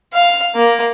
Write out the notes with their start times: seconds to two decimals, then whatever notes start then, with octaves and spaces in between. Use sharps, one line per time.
0.14 F5
0.55 A#3